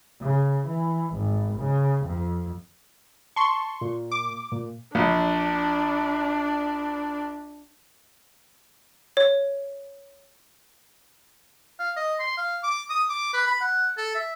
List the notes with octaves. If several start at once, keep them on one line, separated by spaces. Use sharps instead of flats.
C#3
E3
G#1
C#3
F2
A5 C6 C#6
A#2
D6
A#2
A#1 D4
C#5
F5
D#5
C6
F5
D6
D#6
D6
B4
B5
F#5
A4
E5